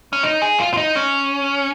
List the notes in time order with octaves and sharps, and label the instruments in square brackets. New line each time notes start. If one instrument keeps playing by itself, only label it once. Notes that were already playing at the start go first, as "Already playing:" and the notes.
[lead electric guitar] C#4
D#4
G#4
F4
F4
D#4
C#4